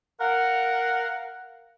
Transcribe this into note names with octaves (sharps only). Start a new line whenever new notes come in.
A#4 F5 F#5